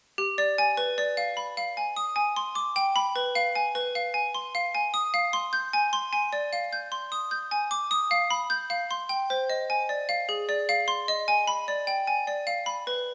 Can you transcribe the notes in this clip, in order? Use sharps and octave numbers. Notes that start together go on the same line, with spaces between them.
G4
D5
G#5
B4
D5
F5
B5
F5
G#5
D#6
G#5
C6
D6
G5
B5
B4
F5
G#5
B4
F5
G#5
C6
F5
G#5
D#6
F5
C6
G6
G#5
C6
G#5
D5
F5
G6
C6
D#6
G6
G#5
D6
D#6
F5
B5
G6
F5
C6
G5
C5
D#5
G#5
D5
F5
G#4
D5
F5
C6
D#5
G#5
B5
D5
G5
G#5
D5
F5
B5
B4